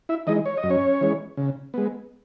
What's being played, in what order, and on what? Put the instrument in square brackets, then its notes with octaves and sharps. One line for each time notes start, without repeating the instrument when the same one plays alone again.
[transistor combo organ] E4 E5
E3 G#3 D#4 D#5
C#5
D#5
F#2
C#4 C#5
E3 G#3
C#3
G#3 B3